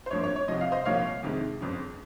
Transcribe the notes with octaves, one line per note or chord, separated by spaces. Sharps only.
C5
G#1 G2 F3 A#3 C#5
C#5
C#5
C2 C3 F3 D#5
F5
C5 D#5
C2 A#2 F3 A#3 C#5 F5
F2 C3 D#3 G#3
G1 F2 C#3